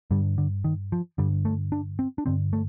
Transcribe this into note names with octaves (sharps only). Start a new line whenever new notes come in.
G2 D3 G3
D3
D#3
F3
G2 D3 G3
A3
D4
C4
D4
G2 D3 C4
A3